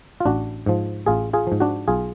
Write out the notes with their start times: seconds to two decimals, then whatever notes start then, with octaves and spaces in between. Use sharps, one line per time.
0.20 F4
0.25 A1 D4 F#4
0.66 G#2 F3
1.06 A1 F4 G#4
1.33 F4 G#4
1.47 G#2 F3
1.60 D4 F#4
1.88 B1 F4 G#4